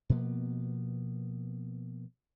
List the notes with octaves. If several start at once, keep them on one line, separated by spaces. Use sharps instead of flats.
B2 F3 A#3 B3